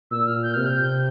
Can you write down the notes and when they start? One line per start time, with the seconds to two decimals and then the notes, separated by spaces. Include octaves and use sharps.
0.11 A#2 E6
0.27 F6
0.43 G6
0.54 C3 F6
0.66 G6